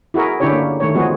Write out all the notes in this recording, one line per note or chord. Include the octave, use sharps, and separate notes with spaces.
E4 F#4 G#4 A#4
D3 C#4 D4 E4 G4 C#5
A#3
D#3 A3 C#5
F3 G#3 B3 F#4 G#4